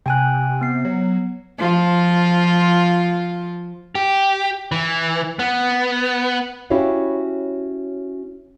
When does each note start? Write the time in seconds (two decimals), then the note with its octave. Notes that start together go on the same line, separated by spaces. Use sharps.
0.06 C3 G5 G#5 F#6
0.61 B3 C7
0.85 F#3
1.59 F3 F4
3.95 G4
4.72 E3
5.39 B3
6.70 C#4 E4 F#4 G4 C#5 F5